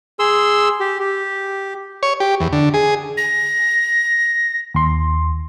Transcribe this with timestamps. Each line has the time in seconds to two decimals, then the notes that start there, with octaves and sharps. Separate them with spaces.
0.19 G#4 C6 E6
0.80 G4
0.99 G4
2.03 C#5
2.20 G4
2.40 E2
2.53 D3
2.74 G#4
3.17 A#6
4.74 D#2 C6